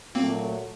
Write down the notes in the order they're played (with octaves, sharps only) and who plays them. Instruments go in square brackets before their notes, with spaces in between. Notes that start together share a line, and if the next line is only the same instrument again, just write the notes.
[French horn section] A#2 F#3 A3 [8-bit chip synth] A#3 C4